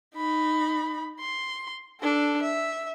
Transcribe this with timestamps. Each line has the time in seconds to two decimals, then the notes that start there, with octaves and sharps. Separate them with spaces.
0.16 D#4 B5
1.20 C6
2.01 D4 A4
2.42 E5